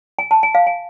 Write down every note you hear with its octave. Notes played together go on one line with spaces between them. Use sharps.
G#5
A5
G#5
F5
G#5